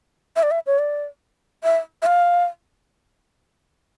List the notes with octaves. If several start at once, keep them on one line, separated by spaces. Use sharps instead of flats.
E5
D5
E5
C#5
D5
E5
E5
F5